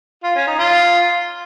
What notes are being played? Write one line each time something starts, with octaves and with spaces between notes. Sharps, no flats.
F4
C#4
D#4
F4